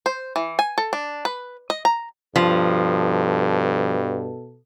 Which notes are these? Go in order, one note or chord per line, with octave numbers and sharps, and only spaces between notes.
C5
E3
G#5
A4
D4
B4
D#5
A#5
G2 B2 F3 A4